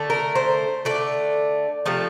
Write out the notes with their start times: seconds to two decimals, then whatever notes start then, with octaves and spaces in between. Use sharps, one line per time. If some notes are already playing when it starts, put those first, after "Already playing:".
Already playing: D3 A3
0.10 A#4
0.35 C5
0.85 D3 A3 D5
1.86 C3 F3 A3